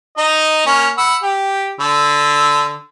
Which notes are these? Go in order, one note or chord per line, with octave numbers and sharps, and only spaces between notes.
D#4 D#5
A#3 C#4
F#5 B5 E6
G4
D3 E6